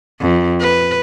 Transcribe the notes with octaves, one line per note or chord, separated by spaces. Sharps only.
F2
B4